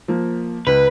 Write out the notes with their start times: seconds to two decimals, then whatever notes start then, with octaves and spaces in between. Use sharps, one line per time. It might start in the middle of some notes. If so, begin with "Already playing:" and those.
0.08 F3 A#3
0.67 C#2 B4